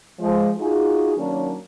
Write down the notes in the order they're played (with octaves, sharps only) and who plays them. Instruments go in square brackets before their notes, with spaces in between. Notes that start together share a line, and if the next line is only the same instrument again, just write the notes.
[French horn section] F3 G#3 C5
D#4 F4 F#4 G#4
D#3 F#3 A#3 C#4 D4 A#4